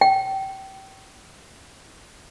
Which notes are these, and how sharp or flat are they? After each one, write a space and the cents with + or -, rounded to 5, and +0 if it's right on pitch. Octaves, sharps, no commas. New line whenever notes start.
G5 -25